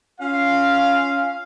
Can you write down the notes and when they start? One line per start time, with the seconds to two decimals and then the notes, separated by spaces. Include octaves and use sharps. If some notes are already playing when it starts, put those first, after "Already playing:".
0.20 C#4 F4 F5